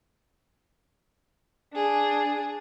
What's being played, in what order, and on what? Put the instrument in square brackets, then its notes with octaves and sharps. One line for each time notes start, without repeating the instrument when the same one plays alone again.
[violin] D4 G#4